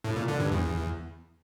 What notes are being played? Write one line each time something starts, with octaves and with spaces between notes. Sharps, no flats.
A2
A#2
D3
G2
E2